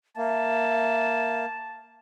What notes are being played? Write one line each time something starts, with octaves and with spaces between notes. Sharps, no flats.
A#3 E5 A5